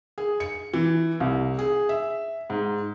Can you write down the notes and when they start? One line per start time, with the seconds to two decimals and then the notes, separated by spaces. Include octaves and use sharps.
0.18 G#4
0.40 C#7
0.74 E3
1.20 C2
1.59 G#4
1.89 E5
2.50 G#2